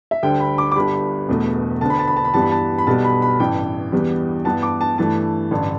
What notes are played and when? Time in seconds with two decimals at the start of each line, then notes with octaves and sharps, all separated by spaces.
0.11 E5
0.23 D2 D3 G3 G5
0.40 B5
0.58 D6
0.72 D6
0.76 G1 G2 G3 B5
1.28 E1 E2 B2 A3
1.81 D2 D3 B3 A5
1.90 B5
1.99 A5
2.07 B5
2.17 A5
2.25 B5
2.34 G2 E3 G3 B3 A5
2.42 B5
2.51 A5
2.78 B5
2.87 B1 B2 G3 B3 A5
3.04 B5
3.22 B5
3.40 A1 G2 E3 G5
3.92 E2 E3 G3 B3
4.45 G2 E3 B3 A5
4.63 D6
4.81 A5
4.98 G2 E3 A3 A5
5.51 A1 G2 D3